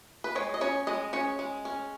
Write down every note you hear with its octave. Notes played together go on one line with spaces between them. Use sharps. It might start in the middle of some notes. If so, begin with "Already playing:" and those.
B4
G#3 C#5
D#5
C#4 C#5
G#3 D#5
C#4 C#5
G#3
C#4